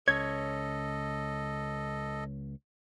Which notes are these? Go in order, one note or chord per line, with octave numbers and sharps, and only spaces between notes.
C#2 C#4 A4 C#5 D#5 G#6